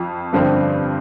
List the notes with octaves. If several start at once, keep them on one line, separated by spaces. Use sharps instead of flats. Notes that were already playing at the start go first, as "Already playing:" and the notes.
Already playing: F2 F4
G2 D3 F3 C4